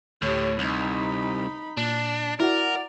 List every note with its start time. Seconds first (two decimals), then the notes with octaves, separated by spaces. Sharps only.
0.22 D2 A2 G4 C#5
0.59 C2 D#4 B5
1.77 A#2 D4
2.40 E4 F#4 A#4 D5 F#5